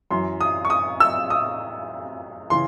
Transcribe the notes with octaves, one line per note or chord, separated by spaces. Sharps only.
F#2 E3 C6
D#6
C#6
D#6
E6
D#6
C#3 E3 C6